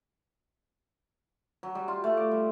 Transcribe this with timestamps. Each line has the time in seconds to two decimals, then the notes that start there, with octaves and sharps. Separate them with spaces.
1.63 F#3
1.75 G3
1.88 F4
2.04 A3
2.17 D5
2.31 G3